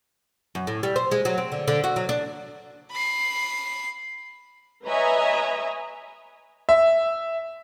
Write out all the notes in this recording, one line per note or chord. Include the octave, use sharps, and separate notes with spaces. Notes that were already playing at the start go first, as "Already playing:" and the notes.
F#2
A2
G3
C5
G#3
F#3
C4
D3
D3
F#4
F#3
D4
B5 C7
B4 C#5 D#5 E5 G#5 A#5
E5